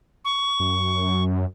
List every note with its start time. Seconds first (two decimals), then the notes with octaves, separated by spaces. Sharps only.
0.25 C#6
0.60 F#2